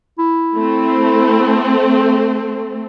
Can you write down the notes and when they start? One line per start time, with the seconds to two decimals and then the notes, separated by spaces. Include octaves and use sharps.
0.19 E4
0.57 A3 C4